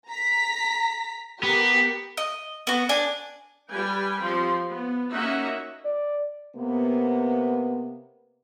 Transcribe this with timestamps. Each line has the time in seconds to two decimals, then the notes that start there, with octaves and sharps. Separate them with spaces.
0.11 A#5 B6
1.43 B3 G4 A#4
2.17 D#5
2.67 B3 F#4
2.89 D4 G#5
3.69 G3 G4 B4 G5 G#5
4.22 F3 C4 G4 C6
4.68 B3
5.11 A#3 C#4 D#4 F#4 E5 F#5
5.85 D5
6.56 C3 A#3 B3